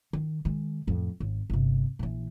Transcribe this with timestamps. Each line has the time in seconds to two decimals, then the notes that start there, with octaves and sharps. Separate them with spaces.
0.13 D#3
0.45 D#3 G#3
0.87 F2 A2
1.20 G#1
1.50 G1 C3
1.99 A#1 E3